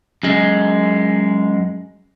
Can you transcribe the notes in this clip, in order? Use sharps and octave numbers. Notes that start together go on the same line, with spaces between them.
F#2 G#3